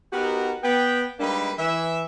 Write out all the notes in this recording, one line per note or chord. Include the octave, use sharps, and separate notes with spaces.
B3 D#4 F#4 G4 A#4
B3 G5
G3 G#3 A#3 D4 D#4 B4
E3 E5